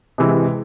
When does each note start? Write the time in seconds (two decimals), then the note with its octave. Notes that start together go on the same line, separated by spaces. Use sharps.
0.18 C3 E3 G#3